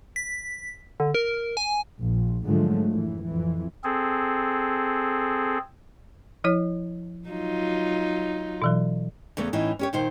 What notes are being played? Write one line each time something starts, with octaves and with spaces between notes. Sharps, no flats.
B6
D3
A#4
G#5
A#1
G#2 D3 F3 F#3 G#3 A3
F#2 A2 E3
F2 E3
C4 G#4 A4
F3 E4 C#5
F#3 D#4 F4
B2 E3 F#3
E2 C#3 A3 B3
A2 E3 C#4 D#4
C#4 G4 C#5
A#2 D#3 D#4 C5